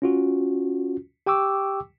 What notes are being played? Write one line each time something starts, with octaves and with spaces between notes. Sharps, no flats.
C#4 F4 F#4
G4 G5 C#6 D6 E6